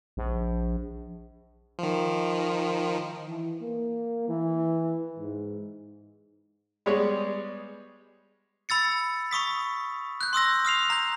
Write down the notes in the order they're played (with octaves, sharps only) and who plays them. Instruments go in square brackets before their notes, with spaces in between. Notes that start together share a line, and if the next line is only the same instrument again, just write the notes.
[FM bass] A#1
[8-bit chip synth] D#3 F3
[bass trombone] E3
A#3
E3
G#2
[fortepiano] G3 G#3 B3 G#4 C#5
[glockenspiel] B5 E6 A6 C#7
B5 C#6 D#6 B6
F#6 G6
C6 D#6 E6 A#6
D#6 F6 C7 F7
A#5 G6